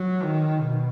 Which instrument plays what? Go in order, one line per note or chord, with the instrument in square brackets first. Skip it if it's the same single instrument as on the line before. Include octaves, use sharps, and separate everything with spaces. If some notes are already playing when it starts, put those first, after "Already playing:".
Already playing: [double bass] F#3
D#3
B2